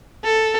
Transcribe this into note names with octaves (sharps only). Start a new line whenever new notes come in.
A4